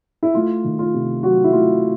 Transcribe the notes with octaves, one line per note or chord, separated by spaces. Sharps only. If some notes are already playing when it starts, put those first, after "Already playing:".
E4
A3 F4
D#3
F4
C3
F#3 F#4
E4
A3 F4